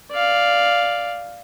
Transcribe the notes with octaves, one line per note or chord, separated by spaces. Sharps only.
D5 F5